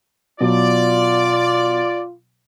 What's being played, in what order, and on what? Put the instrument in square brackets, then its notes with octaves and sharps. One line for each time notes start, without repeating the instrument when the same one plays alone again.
[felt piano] B2 F#3 [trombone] F4 [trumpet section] D5